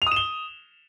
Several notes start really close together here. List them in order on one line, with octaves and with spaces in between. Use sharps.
F7 D#6 E7 G7